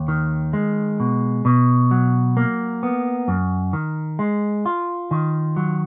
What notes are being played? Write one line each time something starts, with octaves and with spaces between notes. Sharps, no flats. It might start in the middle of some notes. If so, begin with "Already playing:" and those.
Already playing: D#2
D#3
G#3
B2
B2
F#3
A#3
B3
F#2
D#3
G#3
F4
D#3
F#3